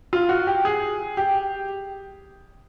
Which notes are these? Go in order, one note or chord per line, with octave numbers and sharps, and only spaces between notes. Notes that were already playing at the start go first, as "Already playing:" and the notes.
F4
F#4
G4
G#4
G4